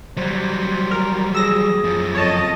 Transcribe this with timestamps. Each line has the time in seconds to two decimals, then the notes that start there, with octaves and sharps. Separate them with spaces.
0.17 F#3 G3 C5
0.91 A#4
1.34 G#4 E6 A#6
1.84 F#2 F3
2.15 F2 A4 C#5 D#5 A5